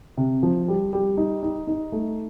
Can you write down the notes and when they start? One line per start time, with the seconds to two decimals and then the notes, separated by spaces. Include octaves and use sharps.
0.17 C3
0.43 F3
0.68 G3
0.93 G3
1.17 D#4
1.43 D#4
1.67 D#4
1.92 A3